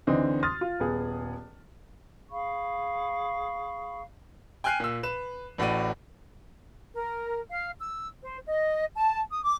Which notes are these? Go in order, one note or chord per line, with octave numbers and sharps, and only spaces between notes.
D2 D3 E3 C4 D#4
C6 D#6 F6 A6
F4
D#1 B3 G#4
G#4 F5 B5 C#6
G5 G#5 F6 F#6 C7 D#7
A#2 E6
B4 E7
A1 A2 F#4 D5 D#7
A#4
F5
E6
C5
D#5
A5
D#6
D6